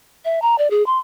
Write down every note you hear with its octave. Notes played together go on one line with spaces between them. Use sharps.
E5
A#5
D5
G#4
C6